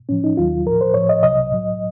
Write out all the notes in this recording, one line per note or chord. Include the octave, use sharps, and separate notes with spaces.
A2 F3 C#4
D#4
D#2 D#3 F#3 F4
A2 F3 A#4
C5
A2 F3 C#5
D#5
C2 C3 F#3 D#5
A2 F#3